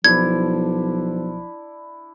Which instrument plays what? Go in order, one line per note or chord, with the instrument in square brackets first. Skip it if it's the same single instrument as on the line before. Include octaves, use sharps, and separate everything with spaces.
[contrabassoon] B1 [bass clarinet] F3 [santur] D4 E4 [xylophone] G#6